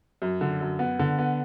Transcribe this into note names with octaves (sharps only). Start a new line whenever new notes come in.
F#2
D3
F#2
B3
D3
B3